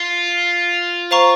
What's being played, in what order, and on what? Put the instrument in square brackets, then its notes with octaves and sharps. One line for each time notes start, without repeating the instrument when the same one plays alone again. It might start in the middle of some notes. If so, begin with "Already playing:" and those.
Already playing: [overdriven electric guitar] F4
[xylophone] C5 F5 A#5 C#6